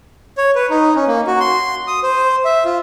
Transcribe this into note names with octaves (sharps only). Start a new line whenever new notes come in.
C#5
B4
D#4
C#4
A#3
F#4
C6
D#6
C5
E5
F4